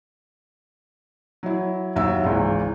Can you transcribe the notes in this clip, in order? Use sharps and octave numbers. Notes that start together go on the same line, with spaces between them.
F#3 E4
F#1 D#2 F#3 E5 E6
G#1 C#2 E3